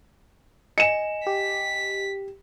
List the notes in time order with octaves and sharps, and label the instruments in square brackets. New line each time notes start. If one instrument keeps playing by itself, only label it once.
[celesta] D#5 G#5 [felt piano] C#7 E7
[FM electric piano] G4 [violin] B6